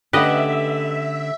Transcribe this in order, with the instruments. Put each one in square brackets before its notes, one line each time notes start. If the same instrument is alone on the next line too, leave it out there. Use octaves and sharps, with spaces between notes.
[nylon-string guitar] D3 A3 C#4 [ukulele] G4 F#5 [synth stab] B4 D#5 [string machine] E5